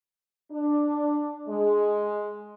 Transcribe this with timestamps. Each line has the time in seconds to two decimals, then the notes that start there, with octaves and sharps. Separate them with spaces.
0.52 D4
1.48 G#3